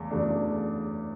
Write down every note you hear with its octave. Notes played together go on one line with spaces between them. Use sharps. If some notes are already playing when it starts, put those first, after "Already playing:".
Already playing: E2 C#3 A3
E2 C#3 F#3 A3 D4